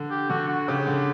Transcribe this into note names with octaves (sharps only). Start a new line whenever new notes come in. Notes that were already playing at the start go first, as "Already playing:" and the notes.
Already playing: D3
G4
D3 F#4
F#4
C#3 G4
D3